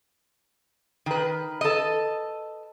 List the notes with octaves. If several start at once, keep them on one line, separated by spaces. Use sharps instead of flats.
D#3 B4
A4 D#5